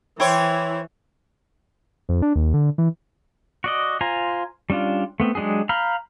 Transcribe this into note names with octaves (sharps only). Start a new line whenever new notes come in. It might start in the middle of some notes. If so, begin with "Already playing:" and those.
E3 E4 C5 C#5 G5 G#5
F2
D4
D#2
D3
E3
F#4 D5 D#5
F4 C5 G#5 A#5
G3 C#4 D4 F4
A3 B3 C4
F#3 G#3 D4 G4 G#4
F5 A#5 B5 F6 G6